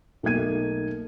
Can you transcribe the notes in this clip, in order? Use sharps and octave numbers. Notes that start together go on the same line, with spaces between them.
B1 A3 A#3 D#4 G#6 D#7